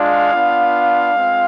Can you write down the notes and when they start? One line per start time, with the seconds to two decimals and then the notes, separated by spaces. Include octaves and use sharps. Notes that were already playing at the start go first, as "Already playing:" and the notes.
Already playing: G#3 D4 F4 F5
0.32 B3 D4 F4
1.14 G#3 C4 F4